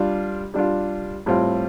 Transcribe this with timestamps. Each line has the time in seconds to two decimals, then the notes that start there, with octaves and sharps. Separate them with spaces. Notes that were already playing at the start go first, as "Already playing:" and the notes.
Already playing: G3 D4 F4
0.54 G3 D4 F4
1.26 A2 G3 C4 F4